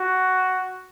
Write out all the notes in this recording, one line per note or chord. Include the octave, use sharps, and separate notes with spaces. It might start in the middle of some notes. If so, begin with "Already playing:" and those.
Already playing: F#4